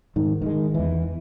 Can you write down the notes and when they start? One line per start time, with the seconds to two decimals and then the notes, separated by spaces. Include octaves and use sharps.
0.16 G#2 D#3
0.42 D#3 G3 G#3
0.74 E2 E3